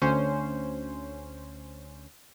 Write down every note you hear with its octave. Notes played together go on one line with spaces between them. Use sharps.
D2 C#4 C5